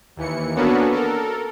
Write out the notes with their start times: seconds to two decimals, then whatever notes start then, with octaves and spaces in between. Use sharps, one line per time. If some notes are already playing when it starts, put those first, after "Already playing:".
0.16 D#2 E3 C#7
0.55 A#3 B3 C#4 D4 F#4 A4
0.91 A4 A#4